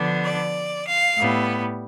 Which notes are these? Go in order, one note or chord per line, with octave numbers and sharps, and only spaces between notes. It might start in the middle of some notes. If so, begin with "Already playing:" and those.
Already playing: D3 F3 B3 D4
D5
F5
A2 G3 B3